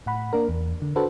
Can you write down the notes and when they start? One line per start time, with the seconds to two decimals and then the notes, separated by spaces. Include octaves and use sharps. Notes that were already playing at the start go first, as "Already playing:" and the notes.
0.06 A2 F#5 B5
0.33 A#3 D4 A#4
0.49 E2
0.82 D3
0.96 D4 F#4 A4 B4 C5